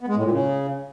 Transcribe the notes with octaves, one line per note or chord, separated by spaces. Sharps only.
B3
G#3
A2
A#2
C#3